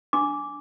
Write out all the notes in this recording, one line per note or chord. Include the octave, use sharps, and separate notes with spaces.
D4 D6